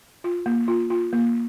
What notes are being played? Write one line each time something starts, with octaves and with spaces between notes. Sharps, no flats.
F4
A#3
F4
F4
A#3